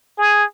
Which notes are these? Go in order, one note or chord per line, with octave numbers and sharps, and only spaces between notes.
G#4